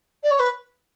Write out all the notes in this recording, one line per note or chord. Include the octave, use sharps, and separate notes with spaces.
D5
C#5
B4